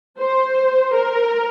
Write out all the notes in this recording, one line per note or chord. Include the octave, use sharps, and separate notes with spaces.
C5
A#4